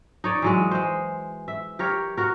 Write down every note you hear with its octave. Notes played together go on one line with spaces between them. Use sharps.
D#4 C#5 D5
E3 F#3 G#3
G#3 C5
E5
G4 A#4 C#5
F#4 A#4